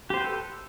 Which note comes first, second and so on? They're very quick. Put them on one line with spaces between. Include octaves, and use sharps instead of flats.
G4 C5 G5 B4 A4